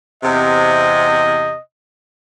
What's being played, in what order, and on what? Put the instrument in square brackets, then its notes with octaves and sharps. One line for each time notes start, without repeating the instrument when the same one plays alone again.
[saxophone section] E2 C3 [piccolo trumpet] D#5